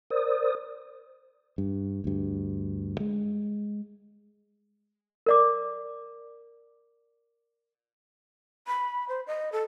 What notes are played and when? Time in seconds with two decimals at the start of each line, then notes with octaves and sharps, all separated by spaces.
0.10 A#4 C5 D5 D#6
1.58 G2
2.04 D2 G2
3.00 G#3
5.26 A#4 D5 D6
8.67 B5
9.09 C5
9.27 D#5
9.52 A4